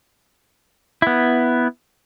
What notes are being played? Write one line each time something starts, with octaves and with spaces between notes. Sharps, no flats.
B3 E4